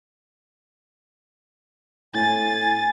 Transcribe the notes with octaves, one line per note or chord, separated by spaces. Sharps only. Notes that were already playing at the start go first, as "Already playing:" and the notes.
A2 G#5 A6